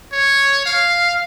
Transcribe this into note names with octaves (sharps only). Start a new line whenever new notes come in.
C#5
F5